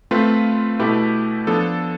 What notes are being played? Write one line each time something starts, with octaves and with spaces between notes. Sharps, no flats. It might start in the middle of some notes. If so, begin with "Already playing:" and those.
A3 C4 F4 B4
B2 A3 E4 G4 B4
F3 B3 D4 A4